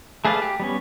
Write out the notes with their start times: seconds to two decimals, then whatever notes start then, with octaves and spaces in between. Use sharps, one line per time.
0.25 A3 G#4 B4 D5 F5
0.42 G4
0.60 G3 B3 C#4